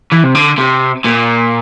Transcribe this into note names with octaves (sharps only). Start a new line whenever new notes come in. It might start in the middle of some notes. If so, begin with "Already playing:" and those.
E3
C3
D3
C3
A#2